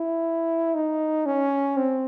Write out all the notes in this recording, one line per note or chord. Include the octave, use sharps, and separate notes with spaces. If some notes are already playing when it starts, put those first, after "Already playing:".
Already playing: E4
D#4
C#4
C4